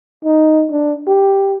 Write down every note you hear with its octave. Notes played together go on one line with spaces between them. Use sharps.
D#4
D4
G4